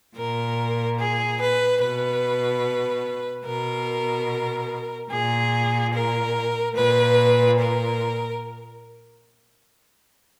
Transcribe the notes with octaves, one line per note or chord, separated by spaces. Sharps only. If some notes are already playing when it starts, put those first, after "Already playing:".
A#2 A#4
G#4
B4
B2 B4
B2 A#4
A#2 G#4
A#4
A#2 B4
A#4